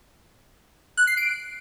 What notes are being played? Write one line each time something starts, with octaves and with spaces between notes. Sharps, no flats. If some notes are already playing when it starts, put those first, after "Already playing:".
F#6
C7
D7